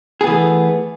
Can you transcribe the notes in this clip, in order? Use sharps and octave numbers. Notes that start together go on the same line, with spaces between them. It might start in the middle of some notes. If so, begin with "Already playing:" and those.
E3 A3 B3 G#4